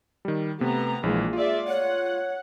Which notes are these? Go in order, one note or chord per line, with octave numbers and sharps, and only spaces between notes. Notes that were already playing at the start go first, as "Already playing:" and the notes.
D#3 G3
C3 A3 B3 A#5
A#1 E3 G#3 A#3 F4
F4 G#4 D5 E5
C#5 F#5